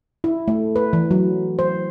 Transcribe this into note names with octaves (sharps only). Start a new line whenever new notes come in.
E4
A3
B4
E3
F#3
C5